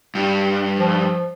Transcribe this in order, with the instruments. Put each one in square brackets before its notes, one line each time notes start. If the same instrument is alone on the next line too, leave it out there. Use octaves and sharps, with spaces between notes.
[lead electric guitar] G2
[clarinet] F3